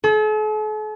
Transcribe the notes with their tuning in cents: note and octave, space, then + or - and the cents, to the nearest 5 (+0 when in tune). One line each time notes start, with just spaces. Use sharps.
A4 -45